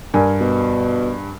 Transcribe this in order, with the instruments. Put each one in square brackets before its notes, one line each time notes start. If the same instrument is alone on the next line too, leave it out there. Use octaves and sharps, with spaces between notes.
[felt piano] G2 A#4 G#5
[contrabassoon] B2